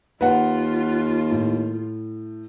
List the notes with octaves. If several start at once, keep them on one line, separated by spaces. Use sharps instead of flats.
D#2 F4 B4 F#5
A2